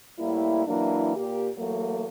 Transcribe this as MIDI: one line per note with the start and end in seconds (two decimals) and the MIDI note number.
0.19 0.62 45
0.19 0.62 55
0.19 0.62 58
0.19 0.62 64
0.67 1.14 52
0.67 1.14 54
0.67 1.14 58
0.67 1.14 62
0.67 1.14 64
1.17 1.49 46
1.17 1.49 58
1.17 1.49 67
1.57 2.09 40
1.57 2.09 54
1.57 2.09 57
1.57 2.09 58